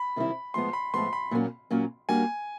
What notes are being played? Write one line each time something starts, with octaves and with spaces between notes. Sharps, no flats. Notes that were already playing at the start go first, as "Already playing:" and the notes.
Already playing: B5
C3 D#3 G3 C4 E4
A2 F3 G#3 B3 C6
B5
A2 F3 G#3 B3 C6
B5
A#2 F#3 A#3 C#4
A#2 F#3 A#3 C#4
G3 A#3 D4 F#4 G#5